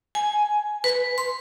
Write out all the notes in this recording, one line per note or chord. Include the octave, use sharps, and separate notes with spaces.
G#5
B4
C6